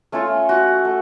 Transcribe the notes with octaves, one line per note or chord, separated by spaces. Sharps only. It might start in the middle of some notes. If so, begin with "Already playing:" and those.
A3 C#4 F4
F#4
A3